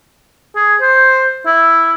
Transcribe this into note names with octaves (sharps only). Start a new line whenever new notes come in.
G#4
C5
E4